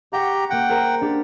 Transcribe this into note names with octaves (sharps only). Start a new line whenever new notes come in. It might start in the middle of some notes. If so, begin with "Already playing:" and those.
G4 F#5 G5 A#5 C#6
A#3 F#5 G5 A#6
A#4 C5 A#5
D4 G4